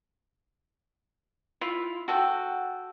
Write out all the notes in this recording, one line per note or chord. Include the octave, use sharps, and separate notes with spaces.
E4 F4
F#4 A4 F#5 G5